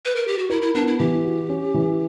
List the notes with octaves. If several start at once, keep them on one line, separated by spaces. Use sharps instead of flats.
B4
A#4
G4
F#4
E4 A#4
E4
B3 D4
E4
E3 G4
F#4
C#4
E3